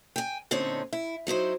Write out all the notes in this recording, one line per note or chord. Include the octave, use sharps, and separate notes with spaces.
G5 G#5
A#2 D3 C4 C#4 D#4 C#5
E4
F#3 D#4 E4 C5